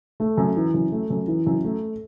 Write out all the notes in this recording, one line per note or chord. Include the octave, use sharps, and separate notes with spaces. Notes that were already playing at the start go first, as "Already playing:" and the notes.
A3
F#2
E3
F#2
A3
F#2
E3
F#2
A3